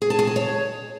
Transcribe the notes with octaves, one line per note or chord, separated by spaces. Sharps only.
G#4
A5
G#4
A5
C#5